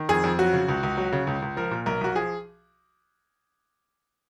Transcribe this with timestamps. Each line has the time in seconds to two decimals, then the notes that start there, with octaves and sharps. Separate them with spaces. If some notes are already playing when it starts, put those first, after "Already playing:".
Already playing: D#3
0.09 F2 G#4
0.24 F2
0.39 F#3 F#4
0.53 C#3
0.68 C#2
0.83 C#2
0.98 F#3
1.12 C#3
1.27 C#2
1.42 C#2
1.57 F3 A#4
1.71 A#2
1.86 B1 A#4
2.01 B1 F#4
2.15 F3 G#4